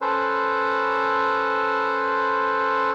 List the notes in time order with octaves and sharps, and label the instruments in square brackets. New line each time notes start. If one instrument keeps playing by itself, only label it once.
[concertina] C#4 A4 B4 C5